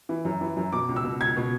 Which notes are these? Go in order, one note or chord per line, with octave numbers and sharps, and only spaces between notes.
E3
F#2
E3
F#2
B2 D6
C#2
E6
B2
C#2 G#6
B2